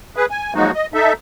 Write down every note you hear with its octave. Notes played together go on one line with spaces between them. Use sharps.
G#4 B4
G#5
F3 F#3 G#3 A#3 D#4 F#4
D#5
D#4 A4 E5